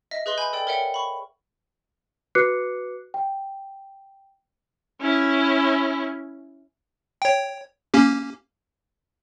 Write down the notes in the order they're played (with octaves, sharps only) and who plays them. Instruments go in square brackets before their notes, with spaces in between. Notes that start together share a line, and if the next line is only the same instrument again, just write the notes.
[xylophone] D#5 E5 A#6
G#4 B4 D#5 C6 G7
G#5 B5 G6
A4 D5 G5
A#4 C#5 E5 F#5 G5
B5 C#6
[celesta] F#4 B4 D6 F#6 C7 C#7
G5
[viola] C#4 E4
[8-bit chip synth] C#5 G5
A#3 C#4 G4